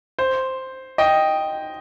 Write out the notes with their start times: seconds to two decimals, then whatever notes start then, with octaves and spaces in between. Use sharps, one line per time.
0.19 C5
0.98 D#5 G5